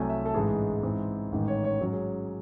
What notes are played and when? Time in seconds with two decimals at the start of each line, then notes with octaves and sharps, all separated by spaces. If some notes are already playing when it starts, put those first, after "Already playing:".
Already playing: C2 C3 F#3 A3 G#5
0.10 E5
0.26 A4
0.34 A1 G#2 E3 G#3 G#4
0.83 G#2 E3 C4
1.32 A1 G#2 D#3
1.48 C#5
1.64 C#5
1.80 G#2 F#3 C#4
1.93 G#4